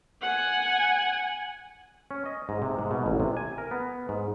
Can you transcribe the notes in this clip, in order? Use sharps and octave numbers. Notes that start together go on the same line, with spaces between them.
F#5 G#5
C#4
D#5
G#2
C3
G#2
B2
A1
C3
G#5
A#4
B3
G#2